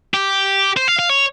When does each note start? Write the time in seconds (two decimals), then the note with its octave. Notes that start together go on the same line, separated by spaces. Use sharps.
0.14 G4
0.77 C5
0.88 F5
0.99 F5
1.09 C#5